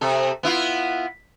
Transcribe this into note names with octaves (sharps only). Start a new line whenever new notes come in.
C3 A4
B3 E4 F4